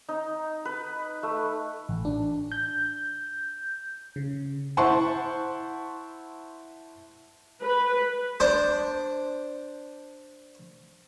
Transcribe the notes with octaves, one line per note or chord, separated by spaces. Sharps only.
D#4
B4
A3
A1
D4
G6
C#3
E4 C5 F#5 A5 C6 C#6
B4
D4 C5